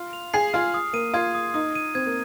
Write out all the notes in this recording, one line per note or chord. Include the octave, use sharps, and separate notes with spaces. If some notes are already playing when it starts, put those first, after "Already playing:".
Already playing: F4
F7
G#4 C7
F4 F6
D#6
A#3 D#7
F4 G#6
D#6
D#4 D#6
D#7
C4 G#6
A#3